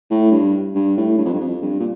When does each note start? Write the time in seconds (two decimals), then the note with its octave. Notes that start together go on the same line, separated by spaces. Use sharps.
0.11 A2
0.32 G2
0.75 G2
0.98 A2
1.19 G2
1.25 F2
1.34 G2
1.41 F2
1.62 G2
1.80 A#2